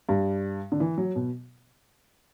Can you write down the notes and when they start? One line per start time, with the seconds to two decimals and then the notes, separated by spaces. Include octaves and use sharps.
0.09 G2
0.72 D3
0.80 E3
0.98 F#3
1.15 B2